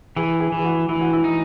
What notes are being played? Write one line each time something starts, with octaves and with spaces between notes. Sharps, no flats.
E3 G#4
G#4
E3
G#4
F#4
E3 E4
F#4
E4
D#4